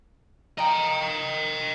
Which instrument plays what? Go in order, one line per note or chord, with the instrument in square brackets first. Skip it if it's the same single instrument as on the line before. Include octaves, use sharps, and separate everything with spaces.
[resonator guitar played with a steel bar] F3 A#5 [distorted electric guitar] D#5 G5